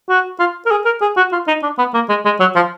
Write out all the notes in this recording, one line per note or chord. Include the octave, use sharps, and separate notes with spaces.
F#4
F4
A#4
G#4
A#4
G#4
F#4
F4
D#4
D4
B3
A#3
G#3
G#3
F#3
F3